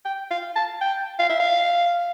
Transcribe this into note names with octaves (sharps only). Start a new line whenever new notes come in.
G5
F5
A5
G5
F5
E5
F5